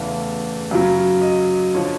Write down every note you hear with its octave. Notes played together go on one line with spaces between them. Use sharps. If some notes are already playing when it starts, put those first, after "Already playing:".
Already playing: E2 C#3 E3 A3
F#2 C#3 F#3
D#5
D3 F3 C#5